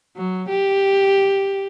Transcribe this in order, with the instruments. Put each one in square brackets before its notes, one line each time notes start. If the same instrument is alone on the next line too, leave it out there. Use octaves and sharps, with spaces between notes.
[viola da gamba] F#3
G4